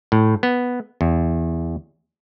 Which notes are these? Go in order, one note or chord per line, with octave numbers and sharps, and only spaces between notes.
A2
B3
E2